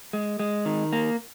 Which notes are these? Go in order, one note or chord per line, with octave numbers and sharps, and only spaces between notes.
G#3
G#3
D#3
A#3